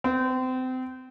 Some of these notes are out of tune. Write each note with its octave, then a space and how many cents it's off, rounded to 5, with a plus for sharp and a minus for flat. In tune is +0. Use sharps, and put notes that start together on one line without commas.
C4 -30